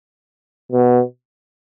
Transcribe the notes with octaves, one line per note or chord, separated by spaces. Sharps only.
B2